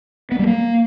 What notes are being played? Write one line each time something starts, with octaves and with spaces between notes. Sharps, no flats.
B3
G3
A#3